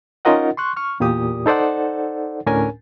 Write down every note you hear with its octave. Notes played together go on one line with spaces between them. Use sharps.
C#4 D#4 F4 A#4 D#5 F#5
C6 C#6 F#6
C#6 F6
E2 A#2 A#3 G4 D#6
D#4 A4 C5 D5 F#5
D2 A2 C#4 D4 A#4 G#5